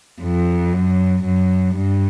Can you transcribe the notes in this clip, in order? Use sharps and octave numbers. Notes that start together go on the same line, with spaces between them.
F2
F#2
F#2
G2